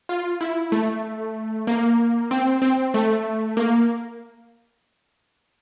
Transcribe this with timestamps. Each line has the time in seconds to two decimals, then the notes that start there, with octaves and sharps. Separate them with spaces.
0.09 F4
0.41 E4
0.72 A3
1.67 A#3
2.31 C4
2.62 C4
2.94 A3
3.57 A#3